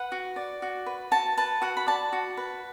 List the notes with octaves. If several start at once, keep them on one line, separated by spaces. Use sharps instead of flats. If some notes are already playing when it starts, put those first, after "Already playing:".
Already playing: B4 F#5
F#4
D5
F#4
B4
F#4 A5
B4 A5
F#4 F#5
B5
D5 A5
F#4
B4